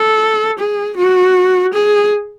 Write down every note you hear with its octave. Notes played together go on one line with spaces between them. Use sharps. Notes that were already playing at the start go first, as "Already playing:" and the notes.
Already playing: A4
G#4
F#4
G#4